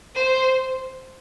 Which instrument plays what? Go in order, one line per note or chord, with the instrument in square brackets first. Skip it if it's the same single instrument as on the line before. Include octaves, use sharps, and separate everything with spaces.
[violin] C5